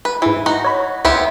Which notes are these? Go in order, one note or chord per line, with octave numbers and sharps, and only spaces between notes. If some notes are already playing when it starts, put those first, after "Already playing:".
B4
G#2 E3 E4
D#4 F#4
C#5 B5
C#2 B3 E4 G4 C6